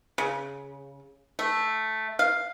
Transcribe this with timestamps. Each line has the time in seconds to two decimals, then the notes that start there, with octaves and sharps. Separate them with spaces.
0.18 C#3
1.39 A3
2.19 F5